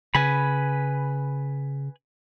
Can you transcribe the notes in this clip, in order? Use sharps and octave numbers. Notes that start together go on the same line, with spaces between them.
C#3 B4 G#5 B5